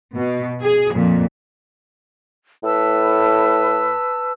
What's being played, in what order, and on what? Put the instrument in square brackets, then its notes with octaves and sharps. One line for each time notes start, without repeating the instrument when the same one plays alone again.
[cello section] B2
G#4
F2 A#2
[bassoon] A2 [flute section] B4 A5 E6